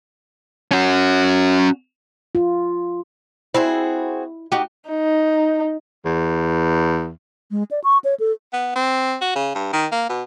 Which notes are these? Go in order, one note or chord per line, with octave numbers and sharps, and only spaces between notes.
C#4 F#4
F4
C4 E4 F#4 G#4
D#4 F#4 G4
D#4
E2
G#3
D5
C#6
C#5
A4
B3
C4
F#4
C#3
G2
D#3
A#3
B2